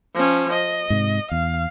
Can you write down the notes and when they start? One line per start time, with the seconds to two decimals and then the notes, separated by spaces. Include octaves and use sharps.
0.14 F3 C#4
0.53 D#5
0.90 G#2 C3
1.31 E2 F5